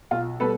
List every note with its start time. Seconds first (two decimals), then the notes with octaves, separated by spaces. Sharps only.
0.11 B1 F4
0.40 B2 G3 A4 B4